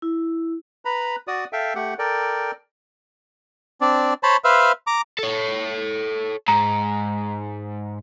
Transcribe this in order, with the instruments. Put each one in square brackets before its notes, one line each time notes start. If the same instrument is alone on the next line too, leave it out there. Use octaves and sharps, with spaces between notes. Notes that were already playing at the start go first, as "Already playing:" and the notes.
[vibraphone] E4
[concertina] B4 A#5 B5
F#4 D5 D#6
A4 E5 F5 G5
A3 G4 F#5
A4 A#4 D5 G5
C4 D4 D5
C5 C#5 A5 B5
B4 C5 E5 F5
A#5 D6
[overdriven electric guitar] A4 C#5
[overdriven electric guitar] G#2 [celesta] A#5